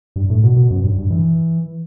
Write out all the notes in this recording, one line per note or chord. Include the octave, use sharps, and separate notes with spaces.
G2
A2
B2
B2
F#2
G2
G2
E3